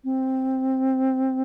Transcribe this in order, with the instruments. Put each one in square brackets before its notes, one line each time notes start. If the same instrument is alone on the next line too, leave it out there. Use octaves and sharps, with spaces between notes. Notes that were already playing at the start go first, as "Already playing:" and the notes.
[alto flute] C4